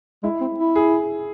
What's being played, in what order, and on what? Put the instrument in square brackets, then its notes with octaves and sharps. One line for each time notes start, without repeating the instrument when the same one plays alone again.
[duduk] G#3 [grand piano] E4
[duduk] C4
E4
[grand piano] G#4